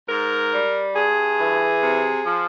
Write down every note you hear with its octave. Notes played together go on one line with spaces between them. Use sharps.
G#2 A#4
G3
G2 G#4
E3
C3
F3